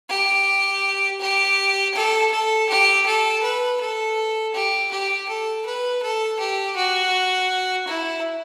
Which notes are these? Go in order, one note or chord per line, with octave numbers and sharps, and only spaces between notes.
G4
G4
A4
A4
G4
A4
B4
A4
G4
G4
A4
B4
A4
G4
F#4
E4